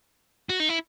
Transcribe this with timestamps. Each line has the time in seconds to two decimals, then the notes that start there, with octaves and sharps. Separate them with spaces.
0.49 F#4
0.60 D#4
0.69 E4